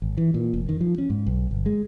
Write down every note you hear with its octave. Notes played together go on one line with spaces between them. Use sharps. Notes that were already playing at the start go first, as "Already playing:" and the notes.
G#1
E3
A#2
F1
D#3
F3
C#4
G#2
B1
G1
G#3